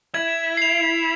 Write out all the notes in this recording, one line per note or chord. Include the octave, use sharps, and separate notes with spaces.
E4 G#6
C7 F7